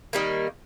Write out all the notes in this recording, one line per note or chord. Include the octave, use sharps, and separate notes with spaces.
D#3 G3 A#3